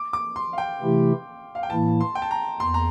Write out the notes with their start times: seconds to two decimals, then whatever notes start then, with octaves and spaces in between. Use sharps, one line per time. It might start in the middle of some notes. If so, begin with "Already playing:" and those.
Already playing: D6
0.13 D6
0.36 C6
0.53 F5
0.58 G5
0.81 C3 E3 A3 E4 G4
1.55 F5
1.63 G5
1.70 A2 E3 A#3 E4 A5
2.01 C6
2.15 G5
2.22 A5
2.31 A#5
2.60 E2 C6
2.74 A#5